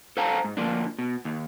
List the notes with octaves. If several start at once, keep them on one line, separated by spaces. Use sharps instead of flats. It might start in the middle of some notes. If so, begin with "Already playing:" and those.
A4 C5 F5 G5 A5 A#5
G#2
D2 F3 A#3 D4
B2
D#2